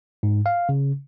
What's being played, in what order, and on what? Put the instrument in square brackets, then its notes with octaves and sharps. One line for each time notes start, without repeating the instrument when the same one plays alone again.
[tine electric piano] G#2
F5
C#3